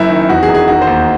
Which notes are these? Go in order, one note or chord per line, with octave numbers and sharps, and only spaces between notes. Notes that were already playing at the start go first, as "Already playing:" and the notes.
Already playing: F#1 F#2 E4
D#3
E2 F#4
G#4
E1
G#4
D#3 F#4
C5
D#2